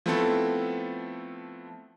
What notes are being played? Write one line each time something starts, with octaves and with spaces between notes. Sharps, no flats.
F3 A3 B3 C4 E4 A4